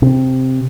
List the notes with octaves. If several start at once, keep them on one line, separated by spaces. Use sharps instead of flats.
C3